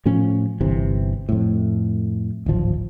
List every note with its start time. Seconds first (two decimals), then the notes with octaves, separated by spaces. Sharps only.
0.06 A2 F3 C#4
0.61 G1 C3 E3
1.29 F2 A2
2.46 D1 G#1 F3